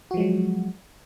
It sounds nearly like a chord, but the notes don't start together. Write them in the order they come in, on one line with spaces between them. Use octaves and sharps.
F#4 F3 G#3 F#3